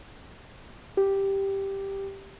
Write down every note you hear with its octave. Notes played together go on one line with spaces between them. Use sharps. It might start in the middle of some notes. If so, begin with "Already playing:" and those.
G4